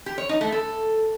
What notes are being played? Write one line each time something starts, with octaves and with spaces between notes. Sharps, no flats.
G4
C#5
D#4
A3
A4